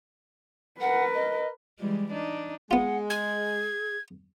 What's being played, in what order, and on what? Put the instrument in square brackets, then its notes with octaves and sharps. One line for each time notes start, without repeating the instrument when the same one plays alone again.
[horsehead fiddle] A#4 B4 [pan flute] F#5
[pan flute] D#5
[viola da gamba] E3 G3 G#3
D4 D#4
[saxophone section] G#3 [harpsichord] B3 F4 [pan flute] F#5
[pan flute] G#4 [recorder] G#6